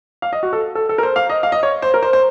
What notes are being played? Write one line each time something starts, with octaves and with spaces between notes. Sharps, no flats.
F5
D#5
F#4
A4
A4
A4
A#4
C5
F5
D#5
F5
D#5
C#5
C5
A#4
C5
C5